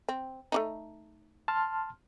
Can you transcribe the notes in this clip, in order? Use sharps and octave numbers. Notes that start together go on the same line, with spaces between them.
C4
A3 D4 D#4
A5 C6 F6